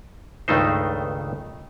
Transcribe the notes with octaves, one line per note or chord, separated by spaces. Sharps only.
C#2 G2 D#3 A3 D#4 C5